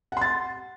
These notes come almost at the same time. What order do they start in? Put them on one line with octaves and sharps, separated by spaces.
F#5 C6 A6